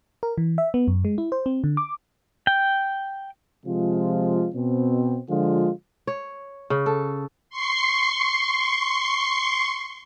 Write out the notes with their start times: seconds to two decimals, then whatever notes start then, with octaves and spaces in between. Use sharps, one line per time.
0.23 A#4
0.38 E3
0.58 E5
0.74 B3
0.88 F#2
1.05 G#3
1.18 E4
1.32 C5
1.46 C4
1.64 D3
1.77 D6
2.47 G5
3.65 C3 F3 G#3 F4
4.54 B2 C4
5.30 D3 F3 G#3 F4
6.07 C#5
6.70 C#3
6.86 A4
7.50 C6 C#6 C7